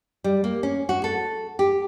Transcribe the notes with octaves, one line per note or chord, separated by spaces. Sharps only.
G3
A#3
C#4
F#4
A4
G4